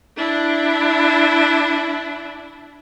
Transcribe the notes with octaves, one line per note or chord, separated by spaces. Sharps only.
D4 E4